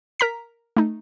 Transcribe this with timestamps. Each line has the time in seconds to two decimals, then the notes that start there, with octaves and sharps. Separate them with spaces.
0.20 A#4 A#5 B6
0.77 A3 D#4